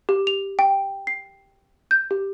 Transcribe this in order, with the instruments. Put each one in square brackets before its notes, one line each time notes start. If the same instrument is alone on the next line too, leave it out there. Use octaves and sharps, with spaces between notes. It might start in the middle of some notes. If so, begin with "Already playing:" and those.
[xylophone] G4
F7
G5
C7
G6
G4